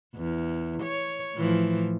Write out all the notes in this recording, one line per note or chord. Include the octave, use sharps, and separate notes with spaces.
E2
C#5
A2 E3 F3